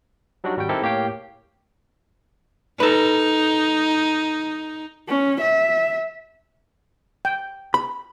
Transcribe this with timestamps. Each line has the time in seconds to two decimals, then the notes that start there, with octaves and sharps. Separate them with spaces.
0.44 F#3 G3 D4 D#4 F#4
0.56 G#1 G3 F#4 G5
0.69 C4 D#4 E4 G4 A4 A#4
0.82 A2 A#3 G4 C#5 F5 G5
2.80 D#4 A4 B4
5.08 C#4
5.41 E5
7.25 G5
7.74 B5